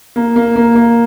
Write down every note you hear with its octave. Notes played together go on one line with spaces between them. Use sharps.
A#3
A#3
A#3
A#3